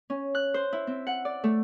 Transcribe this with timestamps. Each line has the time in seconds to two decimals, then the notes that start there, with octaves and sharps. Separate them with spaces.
0.10 C#4
0.35 F#6
0.54 C5
0.73 E4
0.87 C4
1.07 F#5
1.25 D5
1.44 A3